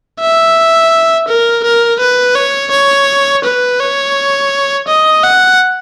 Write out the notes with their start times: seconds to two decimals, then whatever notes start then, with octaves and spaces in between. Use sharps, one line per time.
0.20 E5
1.28 A#4
1.64 A#4
2.00 B4
2.35 C#5
2.71 C#5
3.44 B4
3.80 C#5
4.87 D#5
5.23 F#5